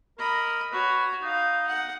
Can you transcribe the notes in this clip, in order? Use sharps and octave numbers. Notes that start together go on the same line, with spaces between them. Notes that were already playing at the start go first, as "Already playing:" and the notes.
A#4 D#5 B5
F#4 B4 C#5
D#4 F5
F#5